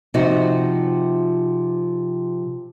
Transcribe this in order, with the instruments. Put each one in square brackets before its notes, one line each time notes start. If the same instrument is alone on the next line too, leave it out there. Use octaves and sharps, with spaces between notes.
[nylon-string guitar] C3 F3 D#4 F#4